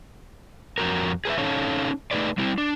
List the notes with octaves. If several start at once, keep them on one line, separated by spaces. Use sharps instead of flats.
F2 B2 F#4 A#4
G#4 B4 C5 E5
C#4 D#4 A4 C#5 F5 A5
A3 D#4 G#4 B4 D5
G3 C4 E4
D4